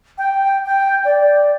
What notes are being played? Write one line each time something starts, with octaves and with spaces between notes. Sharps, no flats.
G5
G5
D5